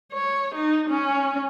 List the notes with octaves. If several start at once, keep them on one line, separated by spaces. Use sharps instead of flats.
C#5
D#4
C#4